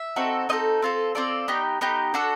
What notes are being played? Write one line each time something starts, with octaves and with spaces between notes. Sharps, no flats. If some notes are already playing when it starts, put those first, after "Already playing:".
Already playing: E5
C4 D#4 F#4 A4
C4 D#4 F#4 A4 D#5
C4 F4 A4
C4 F4 A4 D5
B3 D#4 G4
B3 D#4 G4
D4 F#4 A4